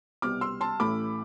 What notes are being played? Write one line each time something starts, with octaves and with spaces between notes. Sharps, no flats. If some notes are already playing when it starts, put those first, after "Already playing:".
C2 B2 G3 B3 D6 F6
C6 E6
A5 C6
A1 A2 E3 A3 B5 D6